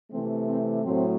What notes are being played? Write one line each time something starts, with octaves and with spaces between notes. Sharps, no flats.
C3 E3 A3 C4
C4
A2 F#3 A3 C4